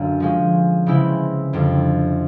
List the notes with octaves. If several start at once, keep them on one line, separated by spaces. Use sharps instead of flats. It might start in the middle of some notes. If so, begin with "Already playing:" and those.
Already playing: F#2 D3 A#3
F3 G#3 C#4
C#3 E3 G#3 C4 E4
F2 D3 G3